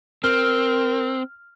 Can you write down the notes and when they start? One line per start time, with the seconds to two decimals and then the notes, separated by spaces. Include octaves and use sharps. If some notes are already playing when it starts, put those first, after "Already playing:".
0.24 C4 A#4 F6